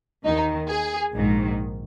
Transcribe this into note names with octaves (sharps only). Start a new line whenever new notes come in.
D#2 D#3 D#4
G#4
A#1 G#2 D#3